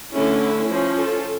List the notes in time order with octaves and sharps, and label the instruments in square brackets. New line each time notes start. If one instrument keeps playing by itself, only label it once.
[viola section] D3 A3 C#4 E4
E4
F3 C#4
F4 A4